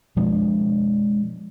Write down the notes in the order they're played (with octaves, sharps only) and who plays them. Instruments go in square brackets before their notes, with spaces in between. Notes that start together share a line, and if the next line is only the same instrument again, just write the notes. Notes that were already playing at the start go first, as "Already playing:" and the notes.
[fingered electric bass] B2 F3 G#3 D4